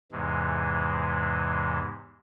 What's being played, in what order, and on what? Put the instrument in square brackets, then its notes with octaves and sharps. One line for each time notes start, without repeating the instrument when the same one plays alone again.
[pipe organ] E2 G#2 C3 E3 G#3